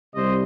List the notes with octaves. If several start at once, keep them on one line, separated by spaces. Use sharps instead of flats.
C2 C3 G3 C5 D#5